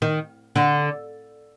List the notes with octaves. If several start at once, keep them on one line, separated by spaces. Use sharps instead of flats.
D#3
D3